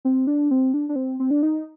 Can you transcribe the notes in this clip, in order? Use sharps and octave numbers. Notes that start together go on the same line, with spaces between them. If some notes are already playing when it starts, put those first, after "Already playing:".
C4
D4
C4
D4
D4
C4
C4
D4
D#4